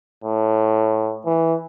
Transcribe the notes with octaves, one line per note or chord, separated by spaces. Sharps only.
A2
E3